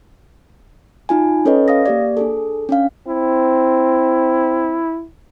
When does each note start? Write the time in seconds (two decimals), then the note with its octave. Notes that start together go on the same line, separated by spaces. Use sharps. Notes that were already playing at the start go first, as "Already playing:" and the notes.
1.09 D#4 F4 G#5
1.45 C#4 A4 B4 C#5 D#5
1.68 F5 D#6 A#6
1.86 A#3 G4 D5
2.17 D4 G#4 A4
2.69 C#4 D4 F5
3.08 C4 E4